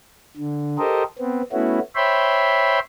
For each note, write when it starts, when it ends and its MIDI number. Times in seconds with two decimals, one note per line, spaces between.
0.37 0.77 50
0.78 1.03 67
0.78 1.03 69
0.78 1.03 70
0.78 1.03 72
0.78 1.03 75
1.19 1.42 59
1.19 1.42 60
1.52 1.79 57
1.52 1.79 59
1.52 1.79 61
1.52 1.79 64
1.52 1.79 66
1.96 2.79 72
1.96 2.79 73
1.96 2.79 76
1.96 2.79 79
1.96 2.79 83
1.96 2.79 84